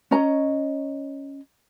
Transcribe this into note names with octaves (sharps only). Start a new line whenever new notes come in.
C#4 C#5 D#5 A#5